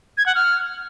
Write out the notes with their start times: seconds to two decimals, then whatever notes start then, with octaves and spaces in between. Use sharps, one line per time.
0.18 G#6
0.26 F#5
0.35 F6